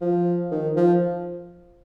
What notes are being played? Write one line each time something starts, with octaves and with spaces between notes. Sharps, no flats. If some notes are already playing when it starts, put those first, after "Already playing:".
F3
D#3
F3